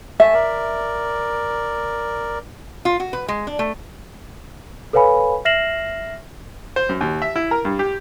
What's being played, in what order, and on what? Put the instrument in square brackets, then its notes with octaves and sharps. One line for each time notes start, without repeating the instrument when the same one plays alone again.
[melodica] A3 G#5 A5 [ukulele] E5
[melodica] A#4 D5
[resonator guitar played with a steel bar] F4
F#4
B4
G#3
D4
A3
[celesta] A4 B4 C#5 F5 G#5 B5
E5 F6 A#6 C7 E7 F#7
[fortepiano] C5
F#2
D#2
E5
E4
A#4
G2
G4